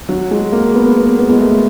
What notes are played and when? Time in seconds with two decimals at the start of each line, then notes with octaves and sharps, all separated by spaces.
0.09 F#3
0.31 G#3
0.52 A#3
0.74 B3
0.97 B3
1.18 B3
1.29 G#3
1.40 A3